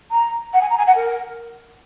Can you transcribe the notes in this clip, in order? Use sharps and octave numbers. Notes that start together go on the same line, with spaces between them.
A#5
F#5
G#5
A#5
G#5
F#5
A#4